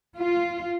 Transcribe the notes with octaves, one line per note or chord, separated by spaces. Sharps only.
F4